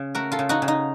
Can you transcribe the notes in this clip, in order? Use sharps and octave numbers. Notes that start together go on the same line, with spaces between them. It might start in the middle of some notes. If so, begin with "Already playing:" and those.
Already playing: C#3
A3 F#4 A#4
F4 A4
C#3
D#4 F#4
C#3
D#4